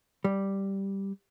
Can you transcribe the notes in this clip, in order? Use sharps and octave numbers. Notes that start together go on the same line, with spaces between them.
G3